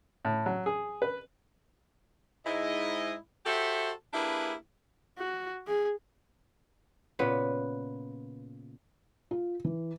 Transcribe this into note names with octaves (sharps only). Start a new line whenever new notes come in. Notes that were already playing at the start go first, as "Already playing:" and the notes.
A2
F#3
G#4
B4
G#2 E4 D#5
F#4 G4 A4 C5 E5
A#3 D4 E4 G4 G#4 B4
F#4
G#4
A#2 C#3 B3 B4
F4
E3